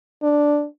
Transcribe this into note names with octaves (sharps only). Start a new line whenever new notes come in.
D4